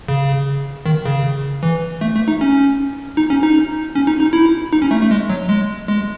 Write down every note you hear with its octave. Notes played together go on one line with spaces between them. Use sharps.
C#3
D#3
C#3
E3
A3
A3
D#4
C#4
D#4
C#4
D#4
C#4
D#4
D#4
E4
D#4
C#4
A3
A3
G#3
F#3
G#3
G#3